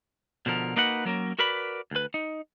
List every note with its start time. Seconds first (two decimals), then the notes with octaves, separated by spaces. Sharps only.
0.46 B2 D3 F3 A#4
0.76 A#3 D#4 F#4 B4 F#5
1.05 F#3 A#3 C#4 A#4
1.39 F#4 A#4 B4 D5 B5
1.91 D2 B4
2.14 D#4